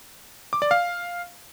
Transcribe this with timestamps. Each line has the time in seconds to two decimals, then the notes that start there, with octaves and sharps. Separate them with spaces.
0.53 D6
0.62 D5
0.71 F5